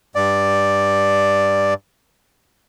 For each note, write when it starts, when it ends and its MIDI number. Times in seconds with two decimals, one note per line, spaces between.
0.15 1.74 43
0.15 1.74 74